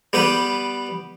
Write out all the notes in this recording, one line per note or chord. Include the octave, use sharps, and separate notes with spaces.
G3 B3 G4 B4